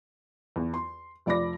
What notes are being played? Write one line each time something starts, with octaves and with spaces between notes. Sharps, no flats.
E2
C6
F1 F3 D5 B5 D6 A#6